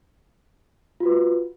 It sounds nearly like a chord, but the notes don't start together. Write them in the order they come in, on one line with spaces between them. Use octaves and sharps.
F4 F#4 B4